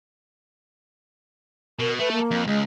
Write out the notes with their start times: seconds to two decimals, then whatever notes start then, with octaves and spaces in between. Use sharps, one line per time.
1.79 B2 A#4
1.99 A3 A4 B4
2.12 A#3
2.31 F2
2.47 C#2 G#3